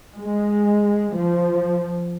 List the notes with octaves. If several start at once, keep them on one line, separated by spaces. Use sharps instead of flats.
G#3
F3